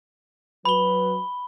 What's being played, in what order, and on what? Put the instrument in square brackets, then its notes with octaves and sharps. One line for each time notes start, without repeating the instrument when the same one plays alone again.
[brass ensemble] F#3 B4 [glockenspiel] B5 G7